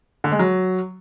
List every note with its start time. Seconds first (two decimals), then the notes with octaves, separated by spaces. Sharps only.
0.24 D3
0.32 G#3
0.39 F#3